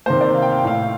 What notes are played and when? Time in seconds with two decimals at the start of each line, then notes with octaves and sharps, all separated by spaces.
0.06 C3 D#3 A#3 C5
0.21 D5
0.34 F5
0.42 G5
0.51 F5
0.58 G5
0.64 A2 A3 F5